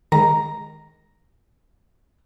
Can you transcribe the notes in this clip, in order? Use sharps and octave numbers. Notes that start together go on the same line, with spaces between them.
D#3 G#3 A#5